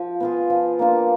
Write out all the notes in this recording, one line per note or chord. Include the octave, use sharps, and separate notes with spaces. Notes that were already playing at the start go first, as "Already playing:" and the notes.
Already playing: F3
B3 F4 G#4
F3
A#3 D4 F4